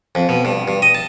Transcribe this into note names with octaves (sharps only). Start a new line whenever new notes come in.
F2
B2
G2
G2
D#5
A5